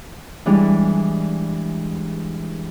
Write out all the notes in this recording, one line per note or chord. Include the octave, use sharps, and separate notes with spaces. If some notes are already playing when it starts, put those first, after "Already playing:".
E3 G3 G#3 D4